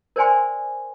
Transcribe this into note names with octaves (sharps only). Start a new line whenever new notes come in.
A#4 C5 D5 G5 G#5 C6